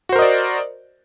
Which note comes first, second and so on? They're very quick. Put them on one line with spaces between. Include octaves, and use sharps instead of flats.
F#4 C5 A#4 D#5 D5